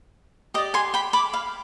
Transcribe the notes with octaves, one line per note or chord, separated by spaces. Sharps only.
G4 D5 D#5
G#5 C6
G5 B5
B5 D6
F5